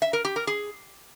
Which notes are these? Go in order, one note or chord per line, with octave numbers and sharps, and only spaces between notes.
E5
A#4
G4
A#4
G#4